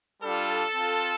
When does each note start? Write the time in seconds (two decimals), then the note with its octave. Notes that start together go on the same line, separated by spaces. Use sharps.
0.23 G3 D4 F4 A4
0.75 C4 F4